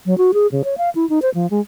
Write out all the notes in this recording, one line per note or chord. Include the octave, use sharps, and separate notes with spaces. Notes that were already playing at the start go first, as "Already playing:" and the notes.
F#3
F#4
G#4
C#3
C#5
F5
E4
D#4
C5
F3
G#3